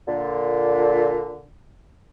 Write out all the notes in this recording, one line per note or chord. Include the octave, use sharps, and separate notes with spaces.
A#2 D3